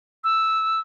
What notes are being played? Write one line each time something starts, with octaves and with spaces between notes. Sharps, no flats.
E6